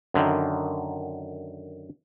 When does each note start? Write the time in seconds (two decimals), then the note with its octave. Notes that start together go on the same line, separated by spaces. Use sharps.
0.14 F#2 D3 D#3